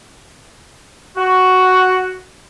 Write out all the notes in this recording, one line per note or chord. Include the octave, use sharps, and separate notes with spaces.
F#4